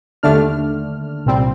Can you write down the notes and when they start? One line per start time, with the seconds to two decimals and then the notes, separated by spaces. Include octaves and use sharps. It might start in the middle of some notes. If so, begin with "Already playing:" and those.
0.23 D#2 D3 A3 D4 F6
1.26 C2 A#2 G3 C4